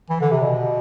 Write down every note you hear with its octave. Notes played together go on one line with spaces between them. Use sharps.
E3
D3
C3
B2